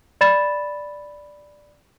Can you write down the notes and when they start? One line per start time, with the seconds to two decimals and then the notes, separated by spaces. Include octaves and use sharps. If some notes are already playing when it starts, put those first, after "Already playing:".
0.21 D5 B5 A6 E7